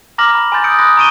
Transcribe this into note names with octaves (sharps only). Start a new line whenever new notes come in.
A#5 D6 F6 A#6 F#7
B5
G#5 B5 C6 G6 A6
D#6 E6 G6 C#7 D7
B5 C6 D#6 F#6 A#6
A#5 C#6 D7 D#7 G7